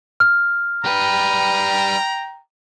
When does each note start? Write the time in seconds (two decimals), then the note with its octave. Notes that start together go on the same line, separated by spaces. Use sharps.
0.20 F6
0.85 G3 B4 G5 A#5